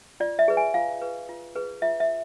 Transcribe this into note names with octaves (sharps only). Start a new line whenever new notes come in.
F4 D5
E5
G#4 B4
G#5
F4 F5
G#4 B4
F4
G#4 B4
F4 E5
E5